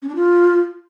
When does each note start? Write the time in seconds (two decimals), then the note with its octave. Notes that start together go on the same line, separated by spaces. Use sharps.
0.02 C#4
0.09 D4
0.15 F4